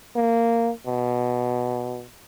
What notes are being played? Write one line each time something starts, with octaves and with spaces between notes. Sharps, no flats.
A#3
B2